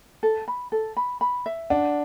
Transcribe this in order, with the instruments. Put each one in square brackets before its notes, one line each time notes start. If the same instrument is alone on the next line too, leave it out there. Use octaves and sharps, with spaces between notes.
[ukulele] A4
B5
A4
B5
B5
E5
[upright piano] D4 [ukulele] F#5